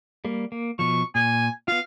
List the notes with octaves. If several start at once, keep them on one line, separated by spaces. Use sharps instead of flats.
G3 A#3
A#3
B2 F3 C#6
A#2 G#5
B3 F4 F5